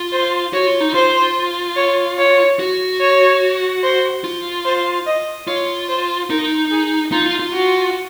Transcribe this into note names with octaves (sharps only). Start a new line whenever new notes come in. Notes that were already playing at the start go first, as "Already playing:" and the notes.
Already playing: F4
C5
F#4 C#5
F4
D#4
F4 C5
C#5
C#5
F#4
C#5
C5
F4
C5
D#5
F4 C#5
C5
D#4 A#4
G#4
D#4 F4
F4
F4
F#4